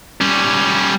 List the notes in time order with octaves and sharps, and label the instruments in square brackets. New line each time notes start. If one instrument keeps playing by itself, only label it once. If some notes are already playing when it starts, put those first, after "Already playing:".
[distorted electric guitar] G3 C#4